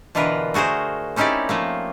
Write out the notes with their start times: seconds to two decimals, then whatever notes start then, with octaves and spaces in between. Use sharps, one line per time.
0.15 B2 D3 E3 F4 A#4 B4
0.54 A3 F#4 G#4 A#4 C5
1.16 C4 C#4 D#4 E4 G4 D5
1.49 F3 A3 A#3